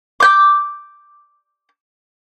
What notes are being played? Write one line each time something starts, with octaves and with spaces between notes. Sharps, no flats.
D6 G6